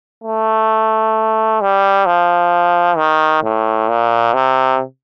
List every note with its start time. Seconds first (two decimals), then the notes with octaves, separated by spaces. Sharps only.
0.24 A3
1.61 G3
2.06 F3
2.97 D#3
3.44 A2
3.89 A#2
4.34 C3